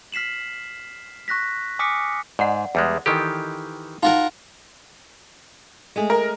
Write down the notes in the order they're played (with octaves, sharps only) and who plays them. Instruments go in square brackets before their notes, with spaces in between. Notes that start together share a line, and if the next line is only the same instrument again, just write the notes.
[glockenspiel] F6 B6 C7 E7 F#7
C#6 F#6 A#6 B6
G#5 D6 D#6 F6 B6 C#7
[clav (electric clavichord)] G#2 [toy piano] D5 F#5
[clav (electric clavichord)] E2 G3 G#3
[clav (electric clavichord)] D#3 E3 G4 [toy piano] A4 D#5
[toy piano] D#4 [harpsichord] F4 F#4 A#4
[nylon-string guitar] G#3 A3 G#4
[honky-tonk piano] A#4